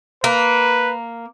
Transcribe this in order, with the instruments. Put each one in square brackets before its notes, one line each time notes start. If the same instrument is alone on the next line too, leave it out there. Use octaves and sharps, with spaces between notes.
[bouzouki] A#3 [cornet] B4